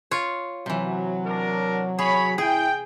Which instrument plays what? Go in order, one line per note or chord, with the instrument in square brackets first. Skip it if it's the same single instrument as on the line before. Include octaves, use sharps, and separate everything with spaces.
[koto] F4 C#5
[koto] C3 E3 [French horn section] F#3
[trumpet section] D4 A#4
[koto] G#4 [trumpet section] C#5 B5
[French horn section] E4 [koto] G#4 [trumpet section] G5